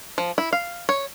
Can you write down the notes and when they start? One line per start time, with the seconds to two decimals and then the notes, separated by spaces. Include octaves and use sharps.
0.18 F3
0.38 E4
0.53 F5
0.89 C#5